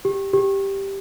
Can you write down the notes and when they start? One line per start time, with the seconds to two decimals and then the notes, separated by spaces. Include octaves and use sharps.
0.05 G4
0.33 G4